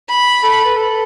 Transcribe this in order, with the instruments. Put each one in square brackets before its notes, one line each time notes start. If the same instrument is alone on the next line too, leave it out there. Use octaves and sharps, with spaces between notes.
[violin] B5
[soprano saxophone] A4
B4
A4